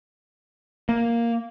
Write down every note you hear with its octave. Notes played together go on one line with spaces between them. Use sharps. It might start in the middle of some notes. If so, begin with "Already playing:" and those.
A#3